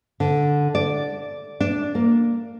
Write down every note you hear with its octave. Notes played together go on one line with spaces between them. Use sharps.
D3
D5
D4
A#3